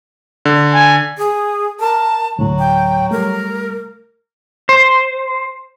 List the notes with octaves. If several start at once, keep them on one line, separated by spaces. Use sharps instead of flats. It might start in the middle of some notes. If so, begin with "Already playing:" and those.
D3
G#5
G#4
A#4 A5
D2 A2 F#3
G5
G3 A3 A#4
C5